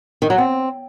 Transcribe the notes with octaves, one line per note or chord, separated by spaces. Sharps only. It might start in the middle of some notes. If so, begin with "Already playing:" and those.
D#3
F#3
C4